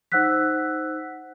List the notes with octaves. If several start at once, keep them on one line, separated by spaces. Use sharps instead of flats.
D#4 C5 F#5 E6 F#6 B6